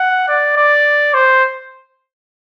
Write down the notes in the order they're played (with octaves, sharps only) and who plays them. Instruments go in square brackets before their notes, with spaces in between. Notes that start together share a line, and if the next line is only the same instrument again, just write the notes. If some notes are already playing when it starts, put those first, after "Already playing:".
Already playing: [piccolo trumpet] F#5
D5
D5
C5